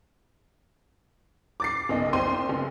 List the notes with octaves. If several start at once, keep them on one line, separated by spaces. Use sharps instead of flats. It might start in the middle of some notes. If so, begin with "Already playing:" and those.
D6 A6 C7
F#1 B1 D#5
C2 C4 C6 D#7
F#1